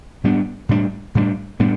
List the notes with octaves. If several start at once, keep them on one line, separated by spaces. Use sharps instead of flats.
A2 G3 B3 D4
A2 G3 B3 D4
A2 G3 B3 D4
A2 G3 B3 D4